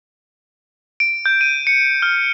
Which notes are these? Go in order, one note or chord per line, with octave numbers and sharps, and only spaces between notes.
D7
G6
D#7
C#7
F6